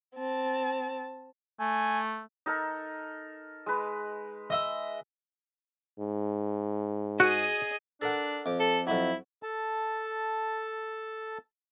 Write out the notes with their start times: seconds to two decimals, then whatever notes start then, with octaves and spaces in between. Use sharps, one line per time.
0.16 C4 A5
1.60 A3 G#5
2.46 D#4 A4 A#4
3.66 G#3 B4
4.50 D#5 E5
6.00 G#2
7.20 F#4 G#4 D#5
8.02 D4 A4 A#4 F#5
8.46 F2 D6
8.60 A4
8.87 F2 F#3 E4
9.43 A4 A5